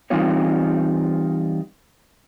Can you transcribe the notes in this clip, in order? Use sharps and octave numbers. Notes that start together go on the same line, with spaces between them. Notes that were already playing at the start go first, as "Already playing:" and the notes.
E3 G3 C4 D#4 F4 C#5